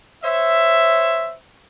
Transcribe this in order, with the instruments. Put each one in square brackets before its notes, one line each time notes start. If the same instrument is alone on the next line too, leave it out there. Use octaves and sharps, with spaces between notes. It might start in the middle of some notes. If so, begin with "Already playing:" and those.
[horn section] C5 C#5 E5